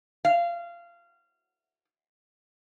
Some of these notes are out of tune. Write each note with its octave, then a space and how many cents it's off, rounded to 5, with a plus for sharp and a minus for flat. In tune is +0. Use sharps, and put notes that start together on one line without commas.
F5 -20